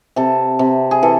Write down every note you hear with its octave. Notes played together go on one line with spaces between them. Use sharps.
C3 A4
C3
G#4
E3 A4